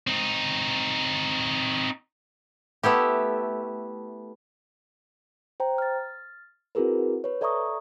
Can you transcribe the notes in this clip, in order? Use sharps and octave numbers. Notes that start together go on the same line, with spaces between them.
C4 D#4
A3 B3 E4 G4
C5 G5 A#5
F6 A6
C4 E4 F#4 G#4 A#4 B4
B4 C#5
A4 D5 E5 A#5 C#6 D#6